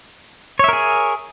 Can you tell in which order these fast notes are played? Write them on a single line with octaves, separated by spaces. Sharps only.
C#5 E5 A#4 G#4